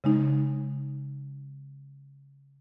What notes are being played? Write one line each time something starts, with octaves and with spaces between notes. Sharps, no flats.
C#3 G#3 D#4